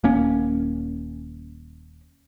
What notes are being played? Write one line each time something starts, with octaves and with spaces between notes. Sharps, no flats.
D#1 A#3 C#4